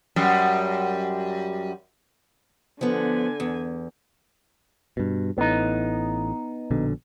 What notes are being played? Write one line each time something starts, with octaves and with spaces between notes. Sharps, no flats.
F#2 G3
D3 F3 B3 G#5
E2
G2 B2
A1 A2 B3 D#4
A#1 B2 D3